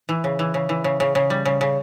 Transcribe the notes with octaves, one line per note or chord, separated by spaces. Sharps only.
E3
C#3
E3
C#3
E3
C#3
C#3
C#3
G3
C#3
C#3